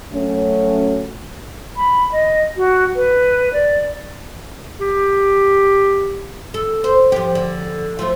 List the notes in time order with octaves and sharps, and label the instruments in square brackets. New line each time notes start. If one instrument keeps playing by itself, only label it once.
[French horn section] F#3 A3 C#4
[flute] B5
D#5
F#4
B4
D5
[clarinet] G4
[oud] A4
C5
F3 G4
D3
F3 A3 F4